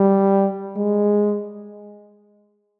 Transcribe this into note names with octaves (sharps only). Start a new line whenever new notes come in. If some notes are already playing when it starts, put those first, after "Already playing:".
Already playing: G3
G#3